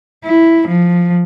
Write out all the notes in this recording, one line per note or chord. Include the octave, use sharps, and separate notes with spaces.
E4
F3